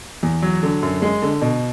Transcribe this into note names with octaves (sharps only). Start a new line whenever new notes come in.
E2
F#3
D3
F#2
G#3
D3
B2